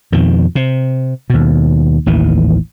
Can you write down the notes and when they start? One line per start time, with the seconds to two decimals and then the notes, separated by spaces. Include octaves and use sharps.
0.12 F2 B2 D#3
0.55 C3
1.30 D#2 B2
2.06 A1 D#2 E3